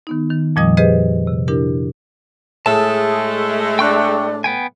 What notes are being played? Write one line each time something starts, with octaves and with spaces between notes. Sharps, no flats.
D#3 B3 D#4
D#3
F2 A#2 F3 G3 D#5 D#6
G4 G#4 B4 C5 D#5
C3
D4 E4 G4 A#4
A2 G#3 A3 G#4 A4 A5
D4 G5 C#6 F#6
B3 G5 G#5